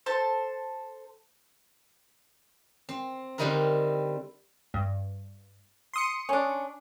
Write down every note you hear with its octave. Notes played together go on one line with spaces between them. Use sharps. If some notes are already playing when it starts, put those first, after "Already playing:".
A4 C5 A5
C4
D3 G3 C4 D#4 E4 A#4
G2
C6 D#6 C#7
C#4 D4